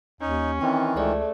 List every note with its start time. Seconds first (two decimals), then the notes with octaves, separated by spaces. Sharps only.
0.21 D#2 C#4 D#4
0.61 D#3 E3 C4 C#6
0.96 C#2 A3 G#4 C5 D5